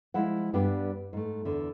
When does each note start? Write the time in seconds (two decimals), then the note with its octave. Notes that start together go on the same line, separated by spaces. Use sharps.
0.14 F3 G#3 E4 F#5
0.53 G2 G3 B3 D4 G4
1.13 G#2 A3
1.45 E2 D3